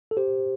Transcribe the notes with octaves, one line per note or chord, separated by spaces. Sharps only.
A4
G4 C5